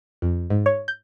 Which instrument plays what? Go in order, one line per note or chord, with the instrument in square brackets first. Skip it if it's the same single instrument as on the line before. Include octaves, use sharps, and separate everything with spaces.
[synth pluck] F2
G#2
C#5
G6